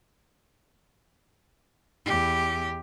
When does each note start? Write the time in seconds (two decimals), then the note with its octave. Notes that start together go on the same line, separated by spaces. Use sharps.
2.05 E2 G4